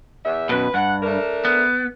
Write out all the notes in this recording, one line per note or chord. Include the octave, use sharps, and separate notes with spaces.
E2 E5
F#2 B2 B4
G2 F#5
A3 D4 A#4
B3